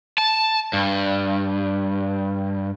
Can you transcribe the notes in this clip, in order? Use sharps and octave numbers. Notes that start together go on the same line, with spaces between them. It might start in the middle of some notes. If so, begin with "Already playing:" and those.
A5
G2